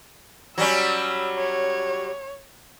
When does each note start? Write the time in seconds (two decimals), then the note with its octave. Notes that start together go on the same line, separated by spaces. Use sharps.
0.58 F#3 G3 C#4 E6
1.38 C#5